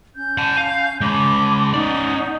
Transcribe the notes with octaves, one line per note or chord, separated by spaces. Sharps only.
C#4 G6
F#5 A5
F5
G#3 C#4 A5 B5 D6
C#4 D#4 D5 F#5